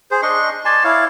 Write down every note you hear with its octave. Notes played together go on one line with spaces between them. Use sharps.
G#4 C5
D4 D#5 C6 C#6
D5 G#5 A5 C6
E4 C#5 F5